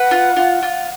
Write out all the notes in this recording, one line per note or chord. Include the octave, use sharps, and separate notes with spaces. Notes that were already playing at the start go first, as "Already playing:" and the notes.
Already playing: B4 F#5
F4
F4
F4